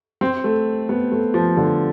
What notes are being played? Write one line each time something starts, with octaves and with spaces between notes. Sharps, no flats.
C4
A3
B3
A3
F3
D3